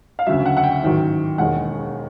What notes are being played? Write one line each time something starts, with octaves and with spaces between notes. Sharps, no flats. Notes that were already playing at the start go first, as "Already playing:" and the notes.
F5
D2 C#3 F#3 E5
F#5
F#5
G5
A1 G#2 D#3 F#3
E1 D#2 D#3 G#3 F#5